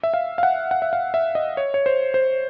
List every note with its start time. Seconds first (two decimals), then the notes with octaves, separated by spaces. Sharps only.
0.03 E5
0.14 F5
0.38 F5
0.43 F#5
0.71 F#5
0.82 E5
0.93 F5
1.14 E5
1.35 D#5
1.57 C#5
1.74 C#5
1.86 C5
2.14 C5